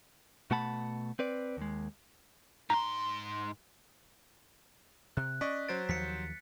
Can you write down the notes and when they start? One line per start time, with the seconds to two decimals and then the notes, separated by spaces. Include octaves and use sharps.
0.51 B2 A3 F#5 A5 B5
1.19 C4 B4 D5
1.57 D#2 G#3
2.70 G#2 A#5 C6
5.17 C3 F#6
5.41 C#4 D5 D#5 C#6 B6
5.69 F#3 C5 A6 D7
5.89 D#2 F3 B6 C#7